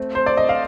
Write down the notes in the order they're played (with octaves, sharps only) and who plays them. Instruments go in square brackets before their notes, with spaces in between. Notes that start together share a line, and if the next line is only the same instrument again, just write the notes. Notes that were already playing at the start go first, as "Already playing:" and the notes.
Already playing: [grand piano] A3 C4
[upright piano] C5
D5
D#5
F5